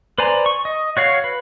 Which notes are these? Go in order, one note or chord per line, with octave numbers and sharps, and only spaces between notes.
B4 C5 D5 G#5 A#5
C#6
D#5
F#4 C#5 F5 F#5
B4